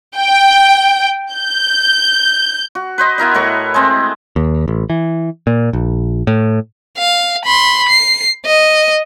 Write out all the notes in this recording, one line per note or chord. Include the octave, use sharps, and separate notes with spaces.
G5
G6
F#4
B4 C5 D#5
B3 E4 A#4 D#5
A2 A#4 B4 C#6
G#3 A3 C4
D#2
A1
E3
A#2
A#1
A2
F5
B5 C6
C7
D#5